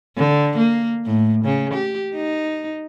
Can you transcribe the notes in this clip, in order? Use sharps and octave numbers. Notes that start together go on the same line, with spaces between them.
D3
A#3
A2
C#3
G4
D#4